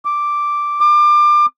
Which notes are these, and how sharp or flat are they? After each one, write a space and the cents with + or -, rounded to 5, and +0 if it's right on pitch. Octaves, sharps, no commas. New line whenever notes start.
D6 +0
D6 +30